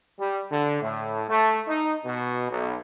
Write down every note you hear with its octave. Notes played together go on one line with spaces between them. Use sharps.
G3
D3
A2
A3
D#4
B2
B1